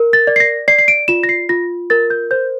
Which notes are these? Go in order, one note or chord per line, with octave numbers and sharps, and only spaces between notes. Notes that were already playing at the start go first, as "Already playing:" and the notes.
Already playing: A#4
A6
D5
C7
A#6
D5 C7
C7
D7
F4 E7
A#6
C7
F4 A#6
A#4 A6
G6
C5 G6